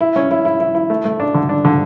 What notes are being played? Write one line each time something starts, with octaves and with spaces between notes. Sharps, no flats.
E4
C#4
E4
E4
E4
E4
A3
A3
D4
D3
D4
D3